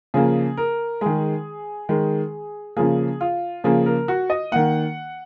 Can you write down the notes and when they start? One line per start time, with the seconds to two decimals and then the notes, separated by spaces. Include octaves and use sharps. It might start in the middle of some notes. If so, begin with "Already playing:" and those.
0.14 C#3 F3 A#3 G#4
0.57 A#4
1.01 D#3 G#3 G#4
1.89 D#3 G#3
2.76 C#3 F3 A#3 G#4
3.21 F4
3.64 C#3 F3 A#3 G#4
3.86 A#4
4.08 F#4
4.30 D#5
4.52 D#3 A#3 F#5